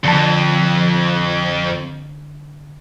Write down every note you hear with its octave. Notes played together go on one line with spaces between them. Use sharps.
F2 D3 A5